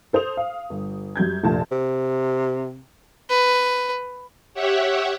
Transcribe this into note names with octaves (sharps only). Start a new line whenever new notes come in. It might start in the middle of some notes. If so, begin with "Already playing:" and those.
A4 C5 D#6 F7
F5
G1
F#2 G3 G6 G#6
F1 A#1 A3 F4 A5
C3
B4
G4 C#5 E5 F#5